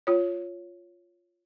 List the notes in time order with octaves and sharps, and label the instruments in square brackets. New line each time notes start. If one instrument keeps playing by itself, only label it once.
[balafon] F4 C#5